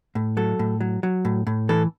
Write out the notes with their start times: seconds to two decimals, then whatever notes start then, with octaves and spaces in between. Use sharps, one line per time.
0.15 A2
0.37 F#3 A4
0.59 A2
0.81 F#3
1.03 F#3
1.25 A2
1.47 A2
1.69 E3 A4